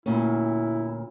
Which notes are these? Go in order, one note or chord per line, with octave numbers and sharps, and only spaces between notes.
D2 A#2 C#4 E4